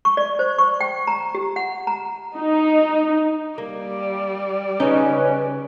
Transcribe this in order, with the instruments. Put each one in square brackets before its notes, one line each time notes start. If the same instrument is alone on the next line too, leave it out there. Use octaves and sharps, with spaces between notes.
[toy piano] C#6
D5
C5
C#6
G5
A#5
G4
F#5
A#5
[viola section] D#4
[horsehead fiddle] G3 D5 [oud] A#3
[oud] C#3 D#4 [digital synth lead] C#4 [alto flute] B4